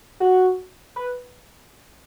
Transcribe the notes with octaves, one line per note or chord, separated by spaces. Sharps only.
F#4
B4